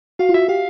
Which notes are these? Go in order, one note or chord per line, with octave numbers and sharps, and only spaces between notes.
F#4 F5
F4
F#4 E5
G4 F5